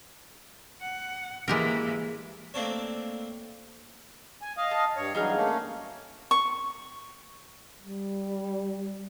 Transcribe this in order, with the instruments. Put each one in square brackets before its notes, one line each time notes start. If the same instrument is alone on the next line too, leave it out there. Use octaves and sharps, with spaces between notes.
[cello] F#5
[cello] E3 A#3 [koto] G#3 G4 A#4
[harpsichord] A3 A#3 C4 D4 A4 C#5
[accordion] G#5
D#5 F5
[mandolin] A5
[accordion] G2 C#5
[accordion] G2 E3 F#3 [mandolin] D#4 G#4 F5
[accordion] A3 A#3 C#4
[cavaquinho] C#6
[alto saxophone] G3